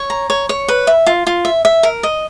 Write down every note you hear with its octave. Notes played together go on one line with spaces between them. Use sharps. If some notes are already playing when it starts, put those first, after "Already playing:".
Already playing: C#5
A#5
C#5
C#5
B4
E5
F4
F4
E5
E5
A#4
D#5